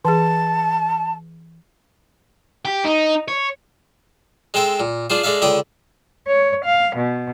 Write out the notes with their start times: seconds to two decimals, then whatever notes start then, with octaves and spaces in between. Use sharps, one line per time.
0.05 E3 G#4 A5
2.65 G4
2.85 D#4
3.28 C#5
4.54 G#3 C4 A4 G5
4.80 A#2
5.10 D4 F4 G#4 C5
5.23 G#3 D4 A4 E5 F5
5.42 C#2 D3 D4 G5 D#6
6.26 C#5
6.64 F5
6.96 B2